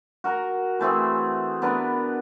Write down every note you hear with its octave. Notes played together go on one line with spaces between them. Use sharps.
F#4 A#4
E3 A3 C4 G#4
B3 D4 A#4 B4